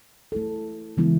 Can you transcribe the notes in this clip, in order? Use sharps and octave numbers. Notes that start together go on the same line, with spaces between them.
A3 E4 A4
C#3 E3 G#3 B3 E4